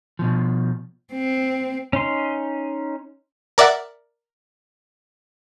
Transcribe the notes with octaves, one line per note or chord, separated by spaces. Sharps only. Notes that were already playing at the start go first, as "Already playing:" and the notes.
B2 F3
C4
C#4 D#4 C6
A#4 D5 E5 F#5